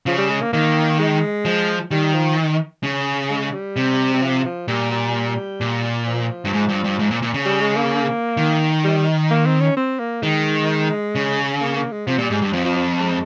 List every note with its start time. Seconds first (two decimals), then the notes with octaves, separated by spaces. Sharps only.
0.06 C#3 F3
0.18 G3
0.30 G#3
0.41 A#3
0.53 D#3 A#3
0.99 G#3
1.45 F3
1.91 D#3 G3
2.14 F3
2.83 C#3
3.30 G#3
3.53 G3
3.76 C3
4.14 G3
4.22 F3
4.45 F3
4.68 A#2 G3
4.91 G3
5.61 A#2
6.07 F3
6.45 G2
6.53 G#2
6.69 G2
6.84 G2
6.99 G#2
7.11 A#2
7.22 A#2
7.34 C#3
7.45 G3
7.61 G#3
7.76 A#3
8.37 D#3
8.84 G3
9.30 A#3
9.46 C4
9.61 C#4
9.77 C4
9.99 A#3
10.22 D#3 G#3
11.15 C#3
11.61 A#3
11.76 A#3
11.92 G#3
12.07 C3 F3
12.18 A#2 G3
12.30 G#2 G3
12.42 G2 G3
12.53 F2 F3
12.65 F3
12.76 F3
13.00 G#3